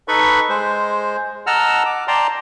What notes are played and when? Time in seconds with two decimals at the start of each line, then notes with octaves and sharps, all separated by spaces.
0.08 D#4 A4 B4 B5 C#6
0.49 G#3 C5
1.47 D#5 F#5 A5 A#5 E6 F6
1.86 D6
2.08 D5 G5 A5 A#5 C6